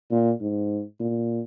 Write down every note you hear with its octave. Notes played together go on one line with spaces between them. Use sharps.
A#2
G#2
A#2